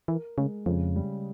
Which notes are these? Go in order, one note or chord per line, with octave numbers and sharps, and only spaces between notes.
E3 A#4
C#3 G#3
F2 C#3
G3